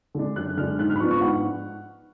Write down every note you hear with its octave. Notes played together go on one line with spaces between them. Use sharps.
D3 G#3 D4
F#2 F#6
D3 G#3 D4 F6
G#2 F#6
F6
B5
F3 B3 D4 C#6
C#6
G#2 F#5